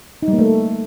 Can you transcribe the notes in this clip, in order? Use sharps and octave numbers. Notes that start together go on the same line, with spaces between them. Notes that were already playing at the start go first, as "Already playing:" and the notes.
D#4
G3
A#3
A3